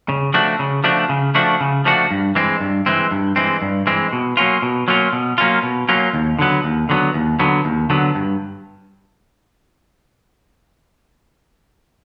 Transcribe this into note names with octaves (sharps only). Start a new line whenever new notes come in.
C#3
F3 A3 D4 F#4
C#3
F3 A3 D4 F#4
C#3
F3 A3 D4 F#4
C#3
F3 A3 D4 F#4
G2
E3 G#3 C4
G2
E3 G#3 C4
G2
E3 G#3 C4
G2
E3 G#3 C4
B2
F#3 A#3 C#4 F4
B2
F#3 A#3 C#4 F4
B2
F#3 A#3 C#4 F4
B2
F#3 A#3 C#4 F4
D#2
D3 F#3 B3
D#2
D3 F#3 B3
D#2
D3 F#3 B3
D#2
D3 F#3 B3
G2